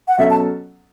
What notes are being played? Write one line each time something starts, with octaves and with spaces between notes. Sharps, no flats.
F#5
B2 F#3 C#4 A4 E5
A5